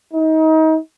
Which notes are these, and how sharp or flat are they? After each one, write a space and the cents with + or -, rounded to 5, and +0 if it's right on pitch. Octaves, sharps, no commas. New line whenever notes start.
D#4 +30